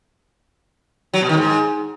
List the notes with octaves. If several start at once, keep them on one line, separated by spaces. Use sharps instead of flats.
F#3
B2
D#3
G#2